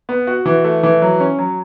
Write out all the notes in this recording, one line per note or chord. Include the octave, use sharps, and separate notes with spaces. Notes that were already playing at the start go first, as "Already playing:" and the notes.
B3
F#4
E3
A3
E3
F#3
C#4
F#3